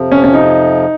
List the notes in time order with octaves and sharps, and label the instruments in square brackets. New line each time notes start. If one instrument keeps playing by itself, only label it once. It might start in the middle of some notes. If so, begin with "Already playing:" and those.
Already playing: [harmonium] F2 C3 F3
[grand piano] C#4
C#4
D#4